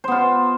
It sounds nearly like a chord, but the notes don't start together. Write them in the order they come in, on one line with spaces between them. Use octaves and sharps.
C5 B3 F4